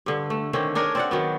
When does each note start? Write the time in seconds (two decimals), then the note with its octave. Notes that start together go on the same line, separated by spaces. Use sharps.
0.06 G2 D3
0.30 A3
0.53 D3 D#3 C4 C#4
0.75 D4 G#4 A#4 C#5
0.95 C4 D5 F#5
1.11 D#3 F#3 B3